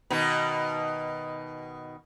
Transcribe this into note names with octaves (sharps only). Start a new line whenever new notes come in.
B2 D#3 D#4